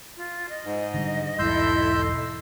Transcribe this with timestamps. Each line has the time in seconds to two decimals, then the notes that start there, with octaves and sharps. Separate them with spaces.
0.17 F4
0.49 D#5
0.65 G#2
0.94 D3 E3 G3
1.39 B1 E2 G#2 E4 A4 C6 E6 G6